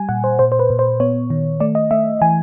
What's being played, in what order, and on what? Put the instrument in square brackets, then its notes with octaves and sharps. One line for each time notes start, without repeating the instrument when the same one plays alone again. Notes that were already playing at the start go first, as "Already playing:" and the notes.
Already playing: [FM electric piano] G3 G#5
A#2 F#5
C5
A#2 C5
C5
B4
A#2
C5
B3 C#5
D#3
A3 D5
D#5
A3 E5
E3 G#5